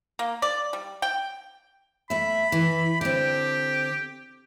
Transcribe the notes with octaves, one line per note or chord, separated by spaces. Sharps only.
A#3
D5
G3
G5
A3 E5 B5
E3
D3 C4 G4